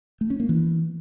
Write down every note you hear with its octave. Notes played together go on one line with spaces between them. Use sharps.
A3
C#4
A#3
E3